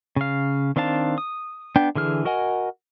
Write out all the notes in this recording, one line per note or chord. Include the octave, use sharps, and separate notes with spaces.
C#3 F5
D#3 C4 D4 F5 A5
D#6
B3 D4 G5
D3 E3 G#4 F6
F#4 A#4 D#5 F#5 G#5